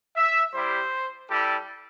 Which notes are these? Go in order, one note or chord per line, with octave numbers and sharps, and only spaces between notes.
E5
G3 E4 G4 C5
G3 E4 G4 A4